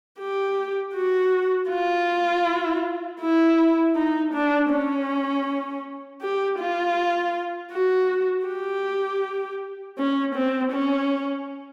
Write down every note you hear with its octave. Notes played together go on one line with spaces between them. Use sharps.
G4
F#4
F4
E4
D#4
D4
C#4
G4
F4
F#4
G4
C#4
C4
C#4